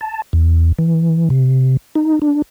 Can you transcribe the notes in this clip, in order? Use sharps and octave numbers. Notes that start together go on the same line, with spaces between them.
A5
E2
E3
C3
D#4
D4